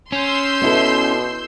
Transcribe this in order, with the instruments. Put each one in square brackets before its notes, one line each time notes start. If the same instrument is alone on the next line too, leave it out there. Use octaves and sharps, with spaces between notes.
[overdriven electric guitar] C#4 [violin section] C6 E6 G6
[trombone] B2 [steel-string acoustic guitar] B3 E4 A4